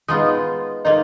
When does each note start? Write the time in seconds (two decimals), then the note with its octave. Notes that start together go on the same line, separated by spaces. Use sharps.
0.08 G#3 B3 D#4 F4
0.85 A#3 D#4 F4